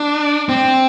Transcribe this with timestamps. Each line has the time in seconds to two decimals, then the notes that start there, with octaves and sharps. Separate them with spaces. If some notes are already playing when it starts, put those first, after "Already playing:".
Already playing: D4
0.49 C4